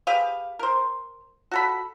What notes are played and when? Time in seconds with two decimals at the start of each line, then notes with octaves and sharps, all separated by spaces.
0.07 G4 G#4 B4 F5
0.59 A#4 C5
1.51 F#4 A4 B5